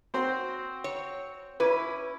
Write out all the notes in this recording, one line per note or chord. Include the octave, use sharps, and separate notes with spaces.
C4 F#4 C5
C#5
C#4 E4 B4 D6